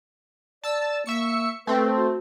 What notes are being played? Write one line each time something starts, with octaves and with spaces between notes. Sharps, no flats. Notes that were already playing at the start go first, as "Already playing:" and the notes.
D5 A5 E6
A#3 E5 C#6 C#7
A3 C4 B4
F#4